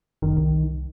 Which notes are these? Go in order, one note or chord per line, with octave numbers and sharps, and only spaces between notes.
F#1 D#3
C2